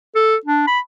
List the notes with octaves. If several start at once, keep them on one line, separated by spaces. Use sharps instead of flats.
A4
D4
B5